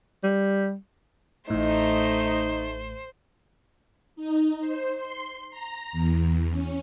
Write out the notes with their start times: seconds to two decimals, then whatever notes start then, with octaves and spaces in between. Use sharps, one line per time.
0.24 G3
1.50 A1 A2 A3 D#4 C5
4.16 D#4
4.60 C5
4.98 C6
5.50 A#5
5.92 E2
6.51 C#4